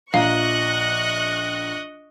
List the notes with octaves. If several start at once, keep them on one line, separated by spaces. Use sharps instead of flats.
A#1 F3 D#5 F5 A#5 C#6 F#6 A#6